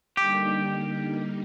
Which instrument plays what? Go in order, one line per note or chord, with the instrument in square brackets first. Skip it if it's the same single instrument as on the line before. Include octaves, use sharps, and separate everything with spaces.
[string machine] D3 G3 A#3 D#4 [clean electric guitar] G4